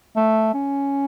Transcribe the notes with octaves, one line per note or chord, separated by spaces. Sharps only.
A3
C#4